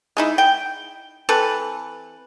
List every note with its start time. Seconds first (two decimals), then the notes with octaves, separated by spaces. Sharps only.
0.17 G#3 D#4 E4
0.38 G5
1.29 E3 C4 A4 B4